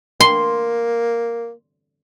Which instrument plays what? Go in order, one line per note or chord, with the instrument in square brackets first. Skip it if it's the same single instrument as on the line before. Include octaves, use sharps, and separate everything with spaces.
[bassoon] A#3 [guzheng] C6